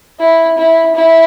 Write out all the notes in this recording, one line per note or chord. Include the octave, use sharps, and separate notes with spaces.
E4
E4
E4